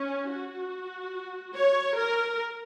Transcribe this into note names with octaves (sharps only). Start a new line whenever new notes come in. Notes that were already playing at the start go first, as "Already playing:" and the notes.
Already playing: C#4
F#4
C#5
A#4